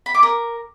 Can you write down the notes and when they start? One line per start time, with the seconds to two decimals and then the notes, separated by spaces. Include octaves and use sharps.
0.06 B5
0.14 D6
0.23 A#4